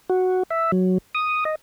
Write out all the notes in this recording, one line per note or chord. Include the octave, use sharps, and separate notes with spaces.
F#4
E5
F#3
D#6
D#5